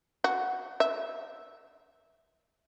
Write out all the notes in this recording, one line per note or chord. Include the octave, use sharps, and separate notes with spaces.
F#4
E5